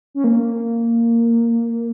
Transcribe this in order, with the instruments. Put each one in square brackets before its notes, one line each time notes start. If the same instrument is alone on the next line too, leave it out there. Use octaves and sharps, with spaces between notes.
[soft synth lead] C#4
A#3